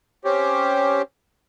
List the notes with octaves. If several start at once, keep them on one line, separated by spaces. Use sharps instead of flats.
C4 C#4 G4